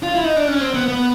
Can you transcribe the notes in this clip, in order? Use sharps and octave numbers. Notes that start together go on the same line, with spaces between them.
F4
E4
D#4
D4
C#4
C4
B3
B3